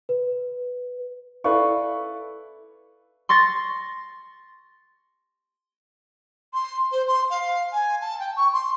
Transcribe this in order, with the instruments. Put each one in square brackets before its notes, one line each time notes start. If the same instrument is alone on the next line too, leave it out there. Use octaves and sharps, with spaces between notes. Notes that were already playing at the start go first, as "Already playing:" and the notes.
[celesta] B4
[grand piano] E4 A4 B4 D5 F5 C#6
[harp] C6 C#6 A6 A#6
[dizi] C6
C5
C6
F5
G#5
A5
G5
C#6
C6